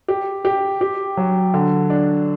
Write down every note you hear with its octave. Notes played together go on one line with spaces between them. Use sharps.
G4
G4
G4
F#3
D3
D4